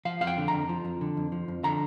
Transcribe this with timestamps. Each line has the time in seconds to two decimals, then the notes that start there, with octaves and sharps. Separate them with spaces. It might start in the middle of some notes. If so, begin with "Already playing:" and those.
0.05 F3 F5
0.21 F2 F5
0.27 G5
0.38 D3
0.48 F2 A#5
0.69 F3
0.85 F2
1.01 D3
1.17 F2
1.32 F3
1.48 F2
1.64 D3 A#5